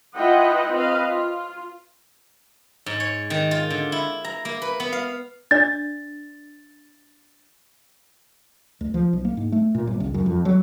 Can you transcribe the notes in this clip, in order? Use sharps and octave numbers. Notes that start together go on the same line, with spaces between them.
E4 F4 B4 D#5 F#5 G5
C4 B4 D#5 F5
F4
G#2
C#5
D#3
F4
D3
E4
A#5
A#3
B4
B3
F5
D4 D5 A6
D2
F3
B1
A#3
G#2
A3
A#2
G1
C#2
F#2
F2
F#3